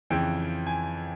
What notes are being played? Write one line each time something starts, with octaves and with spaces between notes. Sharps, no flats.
F2 C#3 E3 G5
G#5